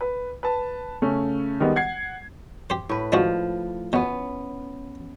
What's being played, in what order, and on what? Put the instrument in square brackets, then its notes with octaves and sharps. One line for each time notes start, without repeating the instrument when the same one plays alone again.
[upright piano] B4
B4 A5
C#3 A3 C#4
D#3 G3 G#3 B3
F#5 G#6 C7
[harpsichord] G4 C5
[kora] A2 B4
[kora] F3 [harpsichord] G#3 D4 F#4
[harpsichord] B2 [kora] B3 C#4